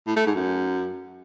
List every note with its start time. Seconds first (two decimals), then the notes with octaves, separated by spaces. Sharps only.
0.07 A2
0.16 A3
0.26 G#2
0.35 F#2